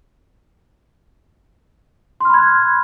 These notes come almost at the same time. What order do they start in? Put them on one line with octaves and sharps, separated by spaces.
C6 F6 B5 G#6 F#6